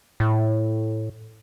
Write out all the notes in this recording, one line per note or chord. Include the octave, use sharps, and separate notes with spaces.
A2